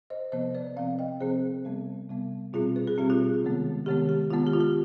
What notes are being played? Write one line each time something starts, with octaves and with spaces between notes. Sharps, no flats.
C5 D#5
C3 F3 B3 C5 D#5
B4 D5
C3 F3 C4 D5 F5
D#5 G5
C3 F3 C4 G#4 C5
C3 G3 B3
C3 G3 B3
B2 G3 C4 F4 G#4
B4
G#4
B2 G3 C4 G4
F4 G#4
C3 D#3 G#3 B3
C3 D#3 G#3 B3 G4
G4
D#3 G#3 B3 F4
G4
F4
G4